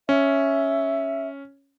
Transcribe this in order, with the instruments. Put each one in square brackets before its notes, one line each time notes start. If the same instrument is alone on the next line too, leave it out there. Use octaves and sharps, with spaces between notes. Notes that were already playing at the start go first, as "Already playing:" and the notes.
[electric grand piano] C#4 [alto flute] E5